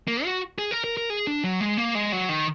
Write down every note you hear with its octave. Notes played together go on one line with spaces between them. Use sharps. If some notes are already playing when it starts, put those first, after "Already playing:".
A#3
F#4
G#4
A#4
A#4
A#4
G#4
D4
F#3
G#3
A#3
G#3
F#3
D#3